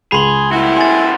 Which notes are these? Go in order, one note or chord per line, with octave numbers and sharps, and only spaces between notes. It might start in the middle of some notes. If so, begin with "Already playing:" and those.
C#2 G#4 B5 C6 G7
C3 G3 A3 E4 F#4
G#5 C6 A6